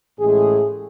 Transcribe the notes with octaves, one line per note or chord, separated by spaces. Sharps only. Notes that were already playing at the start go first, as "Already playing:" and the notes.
A1 A2 G#3 G#4